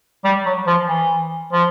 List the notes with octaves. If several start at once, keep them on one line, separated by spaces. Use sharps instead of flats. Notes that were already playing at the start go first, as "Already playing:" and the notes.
G3
F#3
F3
E3
F3